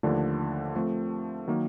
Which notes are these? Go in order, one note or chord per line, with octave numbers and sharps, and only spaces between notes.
D#2 D3 F3 A3 D4
F3 A3 C4
D#3 F#3 A#3